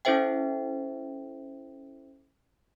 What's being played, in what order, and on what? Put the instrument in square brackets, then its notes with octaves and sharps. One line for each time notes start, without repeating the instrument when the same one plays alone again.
[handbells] C#4 E4 A4 C5 E5 G5